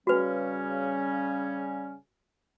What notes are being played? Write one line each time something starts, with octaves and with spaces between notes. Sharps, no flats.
C#3 G3 C#4 F#4 B4